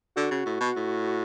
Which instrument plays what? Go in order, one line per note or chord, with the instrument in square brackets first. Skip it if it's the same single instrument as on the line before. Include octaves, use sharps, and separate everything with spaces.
[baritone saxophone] D3 [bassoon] F#4
[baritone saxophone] C#3
A2
B2
A2